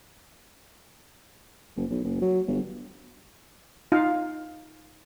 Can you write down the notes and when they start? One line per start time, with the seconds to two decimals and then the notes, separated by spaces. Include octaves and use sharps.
1.77 F#1
1.90 B1
2.04 F#1
2.22 F#3
2.48 G1
3.92 D#4 F4 F5